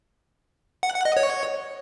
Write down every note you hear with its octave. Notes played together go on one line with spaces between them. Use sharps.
F#5
F#5
D#5
C#5